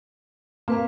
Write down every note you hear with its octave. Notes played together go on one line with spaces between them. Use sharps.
A#3 C4 B4 F5